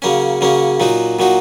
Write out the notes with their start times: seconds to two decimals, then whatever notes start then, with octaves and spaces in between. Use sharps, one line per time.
0.02 C#3 F#3 A#3 C#4
0.41 C#3 F#3 A#3 C#4
0.80 A#2 F#3 D#4 F#4
1.19 A#2 F#3 D#4 F#4